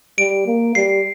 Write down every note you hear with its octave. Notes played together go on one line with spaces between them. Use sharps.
G3 D7
A#3
G3 C7